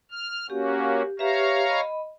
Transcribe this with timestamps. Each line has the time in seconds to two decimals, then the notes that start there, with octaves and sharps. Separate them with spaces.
0.11 F6
0.50 A#3 C#4 F#4 G4
1.19 G4 B4 C#5 E5 F5 A#5
1.70 D#5 B5